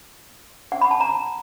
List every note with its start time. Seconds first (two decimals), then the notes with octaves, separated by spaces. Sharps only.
0.72 F#5
0.81 B5
0.91 A5
1.01 A#5